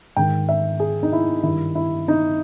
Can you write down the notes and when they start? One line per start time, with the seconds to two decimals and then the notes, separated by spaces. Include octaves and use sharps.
0.16 G#2 D#3 G5
0.49 E5
0.80 G#4
1.03 D#4
1.13 E4
1.43 G2 D#3 E4
1.75 E4
2.08 D#4